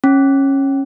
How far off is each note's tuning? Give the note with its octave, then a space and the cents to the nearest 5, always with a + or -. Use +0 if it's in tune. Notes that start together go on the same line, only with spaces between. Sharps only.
C#4 -20